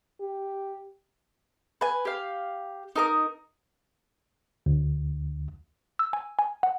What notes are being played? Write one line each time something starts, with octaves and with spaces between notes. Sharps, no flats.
G4
B4 G#5
G4 F5
D#4 A#4 D#6
D2
E6
G#5
G#5
F#5